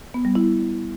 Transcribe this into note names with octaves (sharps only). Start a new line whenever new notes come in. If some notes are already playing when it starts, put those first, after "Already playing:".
B3
G3
E4